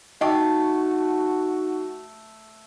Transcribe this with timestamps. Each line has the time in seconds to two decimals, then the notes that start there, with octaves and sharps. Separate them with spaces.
0.21 A3 D#4 F#4 D5 D#5 G5 A5 C#6